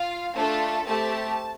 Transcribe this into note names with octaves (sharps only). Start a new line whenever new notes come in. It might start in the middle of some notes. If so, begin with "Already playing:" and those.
Already playing: F4 F5
A3 D4 F4 A4 A5
A3 C4 G4 A5